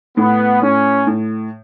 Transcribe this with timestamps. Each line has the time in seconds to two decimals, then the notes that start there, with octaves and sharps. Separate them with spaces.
0.17 A2 B3
0.62 A2 C#4
1.07 A2